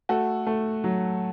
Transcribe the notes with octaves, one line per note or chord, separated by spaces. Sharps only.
A3 F#4 A4
A3
F#3